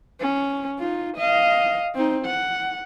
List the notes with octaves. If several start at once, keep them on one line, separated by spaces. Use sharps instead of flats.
C#4
D#4 F4
D#5 F5
C4 D#4
F#5